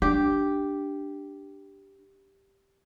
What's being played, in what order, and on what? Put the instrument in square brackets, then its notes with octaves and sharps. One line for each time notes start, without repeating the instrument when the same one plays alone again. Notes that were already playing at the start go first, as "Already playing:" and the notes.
[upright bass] D4 [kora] G4